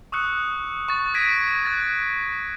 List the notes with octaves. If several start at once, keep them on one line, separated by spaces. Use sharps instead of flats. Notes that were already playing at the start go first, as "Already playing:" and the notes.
C#6 D#6 E6 F#6 C#7
C#6 A6
G#6 A#6 B6 D7 D#7
F#6 A6